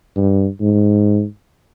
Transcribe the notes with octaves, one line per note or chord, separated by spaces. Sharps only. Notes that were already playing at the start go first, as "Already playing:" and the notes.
G2
G#2